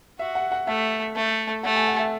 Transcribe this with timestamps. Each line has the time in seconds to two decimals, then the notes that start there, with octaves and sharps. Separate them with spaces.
0.19 F#4 E5
0.35 F#5
0.52 F#5
0.67 A3 E5
1.16 A3
1.63 A3 F#5
1.76 G#5
1.87 F#5
1.99 E5